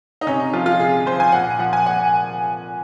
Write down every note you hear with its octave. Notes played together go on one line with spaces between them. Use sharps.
D#4
C3 C#4
D#4
F3 F4
F4
C3 G#4
F3 C5
G#5
A#2 F#5
F3 F#5
G#5
A#2 F#5